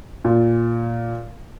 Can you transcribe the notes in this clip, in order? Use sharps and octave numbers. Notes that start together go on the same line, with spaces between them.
A#2